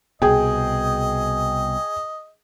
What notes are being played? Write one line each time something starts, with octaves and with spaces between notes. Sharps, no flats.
C2 B2 G#4 D#5 G5